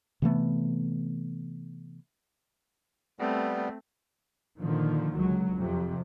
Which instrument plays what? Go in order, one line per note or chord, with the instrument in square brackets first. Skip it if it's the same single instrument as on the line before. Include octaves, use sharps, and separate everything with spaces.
[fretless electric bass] C3 E3 A3 B3
[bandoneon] G3 B3 [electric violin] A3 C4
[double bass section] A#2 D3 D#3 F3
C#2 F#3
F2 C3